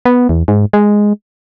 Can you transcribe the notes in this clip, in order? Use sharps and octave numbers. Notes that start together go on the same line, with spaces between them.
B3
E2
G#2
G#3